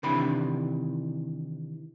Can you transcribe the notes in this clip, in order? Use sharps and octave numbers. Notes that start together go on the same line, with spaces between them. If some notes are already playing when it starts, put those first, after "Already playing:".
C3 D#3 E3 D4 B5